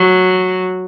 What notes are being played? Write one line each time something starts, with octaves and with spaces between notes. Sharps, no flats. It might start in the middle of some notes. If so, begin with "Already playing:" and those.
Already playing: F#3